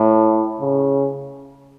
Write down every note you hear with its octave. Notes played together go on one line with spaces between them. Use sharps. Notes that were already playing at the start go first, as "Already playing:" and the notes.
Already playing: A2
C#3